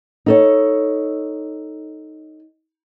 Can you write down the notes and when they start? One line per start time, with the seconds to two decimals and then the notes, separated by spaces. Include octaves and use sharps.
0.26 D#4 A4 C#5